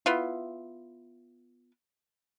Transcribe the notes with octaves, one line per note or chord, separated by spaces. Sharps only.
B3 E4 F4